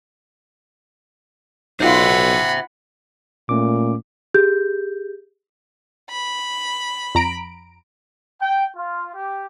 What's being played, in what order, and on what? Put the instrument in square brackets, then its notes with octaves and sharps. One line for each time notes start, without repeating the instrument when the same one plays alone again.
[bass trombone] B1 [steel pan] D#4 F4 [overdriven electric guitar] C5 E5 [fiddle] F#5 B5
[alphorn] A#2 [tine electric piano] A3 C#4 D6
[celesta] G4 G#4 G6
[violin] B5
[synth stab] F2 A#5 D7
[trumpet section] G5
F4
G4